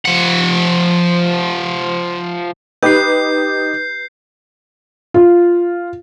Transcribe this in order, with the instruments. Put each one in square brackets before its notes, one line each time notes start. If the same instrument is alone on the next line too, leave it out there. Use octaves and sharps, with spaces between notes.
[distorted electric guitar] F3 F#5
[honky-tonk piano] D#4 G4 [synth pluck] B4 [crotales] G6 C7
[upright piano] F4